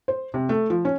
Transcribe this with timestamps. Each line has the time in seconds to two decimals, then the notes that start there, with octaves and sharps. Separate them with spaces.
0.08 C5
0.34 C3
0.49 A3
0.70 F3
0.85 C#4